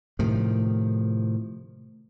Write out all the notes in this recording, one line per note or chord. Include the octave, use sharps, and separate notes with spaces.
A2 C3 D#3 F3